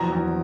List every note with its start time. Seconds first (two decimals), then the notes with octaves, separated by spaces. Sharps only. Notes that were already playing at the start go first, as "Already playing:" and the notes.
Already playing: A#1 E2 F#3 A#5
0.12 E2